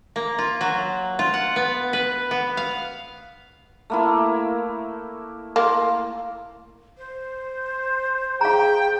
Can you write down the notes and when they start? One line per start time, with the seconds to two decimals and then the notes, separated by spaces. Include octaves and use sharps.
0.16 A#3
0.38 F4
0.61 F#3
1.19 F4
1.34 F#5
1.56 B3
1.93 B4
2.31 B3
2.57 F5
3.90 A3 A#3 E4
5.56 A#3 C6
6.98 C5
8.41 G#4 F5 G5 A#5